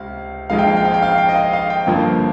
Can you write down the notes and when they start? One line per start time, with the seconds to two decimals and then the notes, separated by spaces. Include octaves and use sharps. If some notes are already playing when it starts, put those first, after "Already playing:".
Already playing: C#2 C3 F5
0.50 A#1 G#2 F3 G#3 F5
0.59 G5
0.67 F5
0.77 G5
0.85 F5
0.94 G5
1.03 F5
1.18 G5
1.29 D#5
1.36 F5
1.53 F5
1.70 G5
1.87 G1 G2 F3 A#3